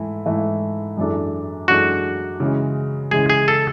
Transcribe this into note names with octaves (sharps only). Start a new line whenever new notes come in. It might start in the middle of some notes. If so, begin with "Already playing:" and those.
Already playing: G#2 E3 A3 E4
G#2 E3 A3 E4
F#2 E3 G#3 D4 A4
F#2 E3 G#3 D4 F#4 A4
C#3 E3 G#3
C#3 E3 G#3 G#4
G#4
A4